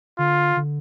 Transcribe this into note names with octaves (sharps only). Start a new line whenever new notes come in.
D3 F4
D3